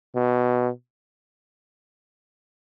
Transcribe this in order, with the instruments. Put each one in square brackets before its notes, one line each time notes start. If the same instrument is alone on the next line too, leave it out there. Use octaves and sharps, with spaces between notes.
[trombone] B2